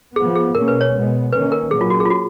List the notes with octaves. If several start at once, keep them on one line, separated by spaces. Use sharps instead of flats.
F3 B3 G#4
G#4
B2 A#3 C#4 A#4
B4
C#5
B2 G#3 B3
D#3 A#3 C#4 B4
A#4
A#2 F#3 A#3 C#4 G#4
F4
F#4
G#4
F4
F#4